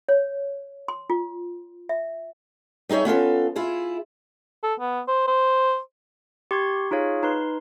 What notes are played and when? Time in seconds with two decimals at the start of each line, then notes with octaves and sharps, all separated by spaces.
0.09 C#5
0.88 C6
1.10 F4
1.89 E5
2.89 G3 D#4 G#4 C#5 E5
3.05 B3 C#4 F4 A4
3.56 E4 F4 G#4
4.63 A4
4.80 B3
5.08 C5
5.27 C5
6.51 G4 C6 C#6 G#6
6.91 D#4 F4 G#4 C#5 F5
7.23 D#4 B4 C6